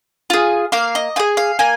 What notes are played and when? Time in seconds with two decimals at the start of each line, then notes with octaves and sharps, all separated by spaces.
0.30 F4 G#4
0.72 A#3 F5
0.95 D#5
1.16 F4 G#4 G#5
1.37 F5
1.59 A#3 G#5